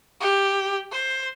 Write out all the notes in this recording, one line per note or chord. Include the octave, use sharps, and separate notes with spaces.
G4
C5